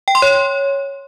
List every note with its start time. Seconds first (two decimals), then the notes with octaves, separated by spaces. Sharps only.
0.08 G5
0.15 C6
0.22 C#5